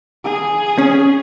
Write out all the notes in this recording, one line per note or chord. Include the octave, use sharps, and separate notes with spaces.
G#4
C#4